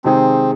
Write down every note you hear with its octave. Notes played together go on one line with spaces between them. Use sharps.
C3 D#3 G#3 C4 D#4 G#4